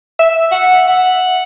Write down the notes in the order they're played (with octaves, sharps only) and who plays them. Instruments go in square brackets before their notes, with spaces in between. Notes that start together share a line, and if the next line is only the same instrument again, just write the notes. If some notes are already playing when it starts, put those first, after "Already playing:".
[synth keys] E5
[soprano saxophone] F#5
F#5